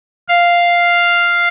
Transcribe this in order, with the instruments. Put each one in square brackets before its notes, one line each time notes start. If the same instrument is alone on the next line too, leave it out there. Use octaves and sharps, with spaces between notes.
[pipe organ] F5